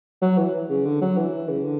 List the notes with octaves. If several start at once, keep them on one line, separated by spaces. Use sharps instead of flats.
F#3
E3
C#3
D3
F#3
E3
C#3
D3